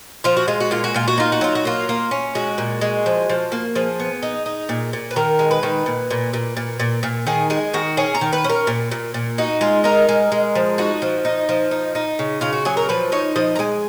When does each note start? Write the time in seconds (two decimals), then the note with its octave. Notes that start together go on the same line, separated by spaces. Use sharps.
0.24 F3 F4
0.37 F#4
0.48 G#3 F4
0.60 F#4
0.71 A#2 F4
0.84 F#4
0.94 A#2 F4
1.08 F#4
1.18 D#4 F4
1.32 F#4
1.41 F#3 F4
1.55 F#4
1.65 A#3 F4
1.89 A#3
2.11 C#4
2.35 G#3 F#4
2.58 A#2
2.81 G#3
3.06 F3
3.29 F3
3.52 A#3
3.75 F3 G#4
4.00 B3
4.23 D#4
4.46 D#4
4.69 A#2
4.93 A#2
5.11 B4
5.16 D#3 A#4
5.39 G#3
5.51 B4
5.63 D#3
5.86 A#2
6.10 A#2
6.33 A#2
6.57 A#2
6.79 A#2
7.03 A#2
7.27 D#3 G#4
7.50 G#3 G#4
7.74 D#3 F#4
7.97 C#4 G#4
8.15 A#4
8.21 D#3
8.33 B4
8.44 C#4
8.50 A#4
8.67 A#2
8.91 A#2
9.14 A#2
9.38 D#4 F#4
9.61 G#3 F4
9.84 D#4 A#4
10.09 G#3
10.32 G#3
10.55 F3
10.78 D#4 F#4
11.02 F3
11.25 D#4
11.49 F3
11.71 D#4
11.95 D#4
12.19 C#3
12.41 C#3 F4
12.53 F#4
12.65 F#3 G#4
12.77 A#4
12.89 F3 B4
13.12 D#4 C#5
13.36 F3 D#5
13.56 A#5
13.59 G#3 G#5